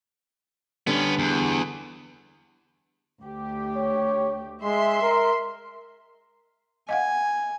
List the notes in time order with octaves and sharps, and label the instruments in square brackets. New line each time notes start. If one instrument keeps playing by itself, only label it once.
[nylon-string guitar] D3 G3 [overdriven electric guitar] B3 C#4
[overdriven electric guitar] E2
[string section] D2 G4
[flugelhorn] C#5
[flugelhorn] G#3 [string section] E5 C6
[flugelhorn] A#4
[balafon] D#5 F5 F#5 [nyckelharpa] G#5